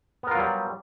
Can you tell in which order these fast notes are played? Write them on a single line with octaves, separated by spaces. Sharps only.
B3 A#4 F4 F#3 G3